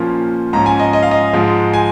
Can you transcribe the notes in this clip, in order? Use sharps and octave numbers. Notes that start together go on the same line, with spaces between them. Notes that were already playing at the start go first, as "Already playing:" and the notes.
Already playing: A#2 F3 A#3 C#4
G#2 F3 C#4 A#5
G#5
D#5
D#5
F5
D#5
G#2 F3 G#3
G#5